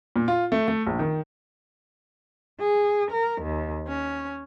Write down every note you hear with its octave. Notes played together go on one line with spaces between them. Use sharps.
A#2
F4
A3
A3
A#1
D#3
G#4
A#4
D#2
C#4